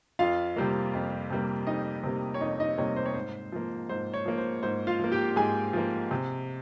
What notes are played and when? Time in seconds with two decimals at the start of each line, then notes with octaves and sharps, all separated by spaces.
0.19 F2 F4 F5
0.56 C3 G3 A#3
0.94 F2
1.30 C3 G3 A#3
1.67 F2 D#4 D#5
2.04 C3 G3 A#3
2.34 C#5
2.41 F2 D#4 D#5
2.60 D#4 D#5
2.78 C3 G3 A#3 C#5
2.96 C5
3.06 C#5
3.14 G#2 C5
3.52 F3 A#3
3.89 G#2 C5
4.14 C#5
4.26 F3 A#3
4.38 C5
4.63 G#2 C5
4.87 F4 F5
4.99 F3 A#3
5.12 G4 G5
5.36 G#2 G#4 G#5
5.73 F3 A#3
6.11 C3